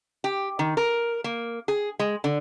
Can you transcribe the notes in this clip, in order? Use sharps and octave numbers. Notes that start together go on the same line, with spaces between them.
G4
D#3
A#4
A#3
G#4
G#3
D3